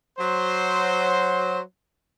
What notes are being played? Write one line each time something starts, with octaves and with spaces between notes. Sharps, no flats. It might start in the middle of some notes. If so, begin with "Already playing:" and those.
F#3 C5